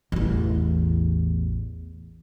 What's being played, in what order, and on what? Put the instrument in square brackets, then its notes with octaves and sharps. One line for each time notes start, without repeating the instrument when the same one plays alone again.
[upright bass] A1 E2